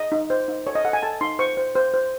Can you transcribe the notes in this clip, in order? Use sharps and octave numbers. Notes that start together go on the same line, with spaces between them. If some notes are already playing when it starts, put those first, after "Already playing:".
Already playing: D#5
D#4
C5
D#4
A4 C#5
D#5
A4 F#5
G#5
A4 A5
D#4 C6
C5 C#6
C5
C5
C5